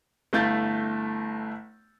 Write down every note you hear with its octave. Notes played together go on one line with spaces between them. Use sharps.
G1 A3 E4 F5 G6 A6